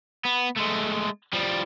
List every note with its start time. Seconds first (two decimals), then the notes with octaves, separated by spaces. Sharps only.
0.25 B3
0.56 G#3 A3
1.33 F3 G3